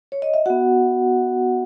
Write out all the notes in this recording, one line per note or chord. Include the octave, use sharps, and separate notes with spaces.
C#5
D#5
E5
B3 F#4 F#5